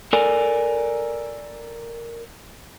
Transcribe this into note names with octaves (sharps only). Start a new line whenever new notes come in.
A4 A#4 D5 G#5